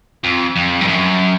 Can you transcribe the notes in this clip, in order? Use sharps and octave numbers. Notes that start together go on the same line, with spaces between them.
F2
F2
G2
F#2